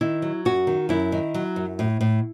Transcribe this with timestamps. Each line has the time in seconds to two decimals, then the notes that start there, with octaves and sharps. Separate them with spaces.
0.01 D#3 E4
0.22 F#3
0.45 F#2 F#4
0.67 D#3
0.89 F#2 E4
1.12 D#3
1.34 F#3
1.56 F#2
1.79 A2
2.01 A2